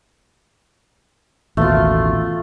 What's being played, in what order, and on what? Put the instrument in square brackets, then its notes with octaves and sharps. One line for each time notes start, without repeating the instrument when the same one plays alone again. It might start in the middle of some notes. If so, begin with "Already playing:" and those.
[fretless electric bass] A1 D#2 B2 [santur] A3 F4